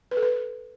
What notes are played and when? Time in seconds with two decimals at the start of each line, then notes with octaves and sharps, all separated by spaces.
0.11 B4
0.17 A4
0.22 B4